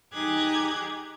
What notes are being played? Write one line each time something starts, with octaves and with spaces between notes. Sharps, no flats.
D#4 G4 G#4 D6 F#6 G#6